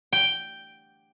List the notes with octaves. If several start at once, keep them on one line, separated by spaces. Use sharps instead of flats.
G5